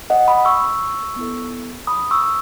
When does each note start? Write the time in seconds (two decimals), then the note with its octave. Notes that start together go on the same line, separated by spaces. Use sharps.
0.10 D#5 F#5
0.28 B5 D#6
0.45 C#6 E6
1.16 B3 E4 A4
1.87 B5 D#6
2.11 C#6 E6